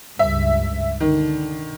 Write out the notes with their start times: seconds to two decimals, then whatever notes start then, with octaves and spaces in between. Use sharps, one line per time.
0.19 C#2 G2 E5
1.00 D3 D#3